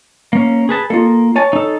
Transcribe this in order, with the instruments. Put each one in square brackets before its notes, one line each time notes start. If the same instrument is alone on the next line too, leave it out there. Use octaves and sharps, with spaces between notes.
[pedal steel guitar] A#3 C#4
G#4 B4 A5
[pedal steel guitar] A#3 [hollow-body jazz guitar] F4 A4
[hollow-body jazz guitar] C#5 G#5 A5
[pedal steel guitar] D#4 A4